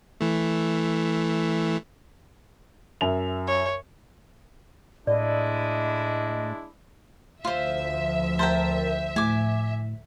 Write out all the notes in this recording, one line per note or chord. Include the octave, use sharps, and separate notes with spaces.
E3 A3
F#2 E5 F7
C#5
A2 G#3 D4 E4 D5 D#5
D2 F3 F4 C5 E5
A#4 C5 G5 A5
A2 G#5 D6